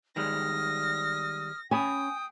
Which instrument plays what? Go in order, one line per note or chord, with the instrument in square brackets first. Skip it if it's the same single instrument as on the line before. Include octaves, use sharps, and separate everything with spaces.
[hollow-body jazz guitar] D#3 G3 G#3 [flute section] D#6 F6 [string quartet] A#6
[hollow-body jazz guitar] C#4 B5 [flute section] G5 D#6 [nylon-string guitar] G#5